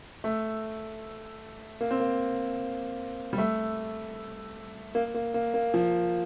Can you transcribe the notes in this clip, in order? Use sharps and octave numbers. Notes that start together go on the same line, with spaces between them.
A3
A#3
C4
A#3
G3
A3
A#3
A#3
A#3
A#3
F3